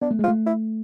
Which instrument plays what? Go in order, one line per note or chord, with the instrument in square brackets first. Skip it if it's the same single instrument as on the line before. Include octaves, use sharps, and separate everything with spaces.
[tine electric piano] B3 [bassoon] D4
[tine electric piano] A3
G#3
[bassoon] F4
[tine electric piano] A3
[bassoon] E4